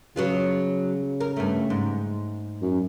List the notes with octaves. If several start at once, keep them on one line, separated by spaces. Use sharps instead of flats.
C#3 F#3 B3 F4
A#4
G2 A3
G#2
F#2